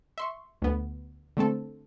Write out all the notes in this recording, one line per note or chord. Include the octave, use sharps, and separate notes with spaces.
E5 C6 C#6
D2 B3
D3 A3 C4 A4